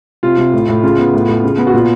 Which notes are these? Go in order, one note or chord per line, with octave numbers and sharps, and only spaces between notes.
C3 F4
C3
A2
A2
C#3 F4
B3
A2
A2
C#3
B3
F#4
A#2 F4